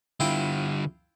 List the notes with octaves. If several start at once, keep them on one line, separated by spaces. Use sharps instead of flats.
D3 G3 E4 F4 G5